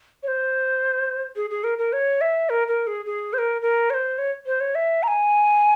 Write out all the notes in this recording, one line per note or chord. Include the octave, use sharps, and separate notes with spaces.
C#5
C5
G#4
G#4
A#4
A#4
C#5
E5
A#4
A#4
G#4
G#4
C5
A#4
A#4
C#5
C5
C#5
C5
C#5
E5
A#5
G#5